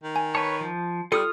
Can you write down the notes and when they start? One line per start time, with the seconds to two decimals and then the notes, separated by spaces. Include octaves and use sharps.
0.04 D#3
0.16 G#5
0.35 B4 C#5 A5
0.61 F3
1.12 G3 F4 A4 D#6 F6 C#7